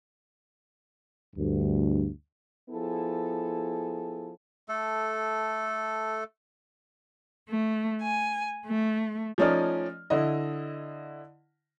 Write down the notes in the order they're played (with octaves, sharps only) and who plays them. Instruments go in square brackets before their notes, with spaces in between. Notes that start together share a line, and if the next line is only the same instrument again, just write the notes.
[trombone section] D2 G2
[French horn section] F3 B3 E4 G#4 A4
[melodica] A3 A4
[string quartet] A3
G#5
A3
[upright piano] F3 A3 C#4 D#4 D5 F6
D3 E4 D#5